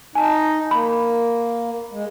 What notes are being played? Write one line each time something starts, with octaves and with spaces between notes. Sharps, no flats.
D#4 G#5 A5
A#3 B5
G#3